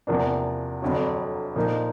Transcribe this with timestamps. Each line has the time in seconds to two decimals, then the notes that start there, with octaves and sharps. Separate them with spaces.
0.07 E2 C3 F3 A#3 D4
0.82 G1 F2 D3 F#3
1.56 A#2 F3 A#3 D#4